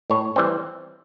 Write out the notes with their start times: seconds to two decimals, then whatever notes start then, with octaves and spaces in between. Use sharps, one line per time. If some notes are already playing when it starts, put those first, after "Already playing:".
0.10 A2 C#5
0.36 E3 G3 C4